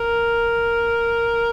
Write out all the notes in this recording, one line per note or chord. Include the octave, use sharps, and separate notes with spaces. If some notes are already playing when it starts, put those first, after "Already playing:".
Already playing: A#4